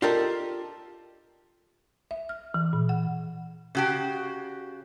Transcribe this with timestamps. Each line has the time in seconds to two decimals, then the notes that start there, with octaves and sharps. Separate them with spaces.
0.02 F4 G4 A4 A#4 D5 D#5
2.11 E5
2.29 F6
2.54 E3
2.73 A#2
2.89 F#5
3.75 C#3 F#4 G4